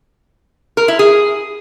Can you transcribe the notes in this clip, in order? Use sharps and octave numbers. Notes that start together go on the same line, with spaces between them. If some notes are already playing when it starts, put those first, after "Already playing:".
A#4
E4
G#4